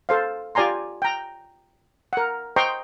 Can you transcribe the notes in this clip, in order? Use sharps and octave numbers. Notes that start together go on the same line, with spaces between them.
A4 C5 F5
F4 G4 D5 G#5 A#5 C6
G5 A#5
A#4 F#5
C5 D#5 G5 A#5 C6 C#6